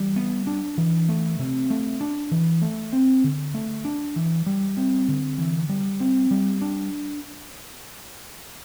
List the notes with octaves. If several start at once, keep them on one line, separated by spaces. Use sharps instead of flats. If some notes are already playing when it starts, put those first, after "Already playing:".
Already playing: E3 G3
B3
D4
E3
A3
C3
A3
D4
E3
A3
C4
D3
A3
D4
E3
G3
C4
D3
E3
G3
C4
G3
D4